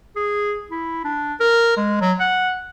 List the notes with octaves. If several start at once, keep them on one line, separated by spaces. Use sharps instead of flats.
G#4
E4
D4
A#4
G#3
F#3
F#5